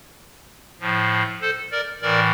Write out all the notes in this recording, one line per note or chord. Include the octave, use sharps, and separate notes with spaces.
A2 F3
A4 C5
A#4 D5
A2 E3 A#4 D5